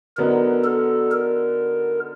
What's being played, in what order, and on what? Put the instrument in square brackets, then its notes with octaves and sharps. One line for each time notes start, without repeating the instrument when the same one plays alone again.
[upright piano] D3 F#3 B3 D#4 [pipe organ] A#4
[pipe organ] A4
A#4